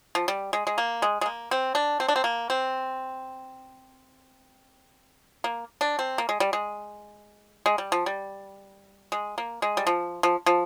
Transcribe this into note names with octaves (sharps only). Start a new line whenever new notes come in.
F3
G3
G#3
G#3
A#3
G#3
G#3
A#3
C4
D4
C4
D4
C4
A#3
C4
A#3
D4
C4
A#3
G#3
G3
G#3
G#3
G3
F3
G3
G#3
A#3
G#3
G3
F3
F3
F3